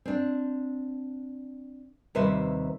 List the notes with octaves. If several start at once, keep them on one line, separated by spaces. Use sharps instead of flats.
C4 D4
D#2 C3 G3 B4 C5 E5